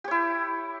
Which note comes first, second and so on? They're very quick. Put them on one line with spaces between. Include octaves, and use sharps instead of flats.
G4 C#5 E4